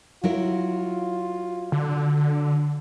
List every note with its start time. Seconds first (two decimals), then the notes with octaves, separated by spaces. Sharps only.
0.24 F#3 E4 F4 A#4
1.72 D3